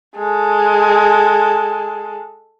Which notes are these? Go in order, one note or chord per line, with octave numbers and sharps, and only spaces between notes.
G#3 A4